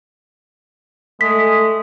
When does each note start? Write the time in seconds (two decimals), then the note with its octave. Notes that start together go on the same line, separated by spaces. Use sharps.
1.21 G#3 A3 B6